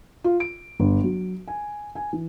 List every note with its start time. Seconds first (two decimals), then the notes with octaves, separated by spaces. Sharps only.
0.24 F4
0.40 D7
0.80 G1
1.04 F#3
1.48 G#5
1.95 G#5
2.13 E3